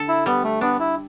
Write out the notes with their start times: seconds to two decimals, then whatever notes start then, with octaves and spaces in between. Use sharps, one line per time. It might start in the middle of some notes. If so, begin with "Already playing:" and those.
Already playing: D3 A4
0.08 E4
0.26 G3 B3
0.44 A3
0.61 B3 D4
0.80 E4